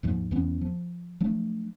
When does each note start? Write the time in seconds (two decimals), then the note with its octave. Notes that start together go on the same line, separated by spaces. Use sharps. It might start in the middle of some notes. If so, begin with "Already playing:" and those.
0.03 D#2 G#2 F3
0.31 E2 E3 B3 C#4
0.61 F3
1.21 F3 F#3 A3 D4